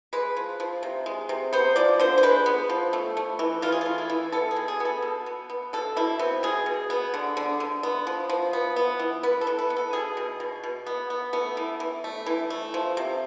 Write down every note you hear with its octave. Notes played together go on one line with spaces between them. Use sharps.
G#3 B4
F3
F3
C3
G#3
C3
B3 C5
F3 D5
D3 C5
C5
G#3 B4
B3
F3
A3
A3
E3
E3 F4
G#4
A3 F4
E4
E3
B3 A4
G#4
B2
G#4
B3
A4
B2
B3
B3
B2 A4
B2 E4
B3 C4
B2 G#4
B2
B3
D3
D3
D3
B3
F3
F3
B3
B3
E3
B3 B4
A4
E3
B4
B3
A4
B2 G#4
B2
B2
B2
B3
B3
A3 B3
E3
E3
A3
E3
A3
F3
C3